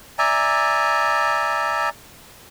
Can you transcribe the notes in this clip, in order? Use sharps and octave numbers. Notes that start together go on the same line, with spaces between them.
D5 E5 G#5 A#5